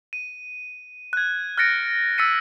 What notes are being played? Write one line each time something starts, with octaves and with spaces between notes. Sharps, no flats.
D#7
F#6 G#6
F6 F#6 A6 A#6 C#7 D7
E6 A6 B6 C#7 D#7